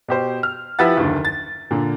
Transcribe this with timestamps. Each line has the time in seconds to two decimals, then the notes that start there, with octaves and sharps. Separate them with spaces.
0.08 B2 G4 C5
0.43 F6
0.79 F3 E4 G4 B4 F#5 A6
0.97 F#1 D#2 D3
1.25 A6
1.71 A#2 D3